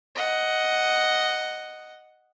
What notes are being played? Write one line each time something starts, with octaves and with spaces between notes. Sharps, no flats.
D#5 F#5